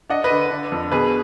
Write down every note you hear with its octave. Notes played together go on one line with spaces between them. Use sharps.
D4 D#5 F#5
B4 D#5
D3
D4
F2
B2 G#4 B4